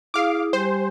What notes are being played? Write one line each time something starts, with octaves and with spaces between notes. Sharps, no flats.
E4 G#4 F5 D6 D#6
G3 G4 C5 G#5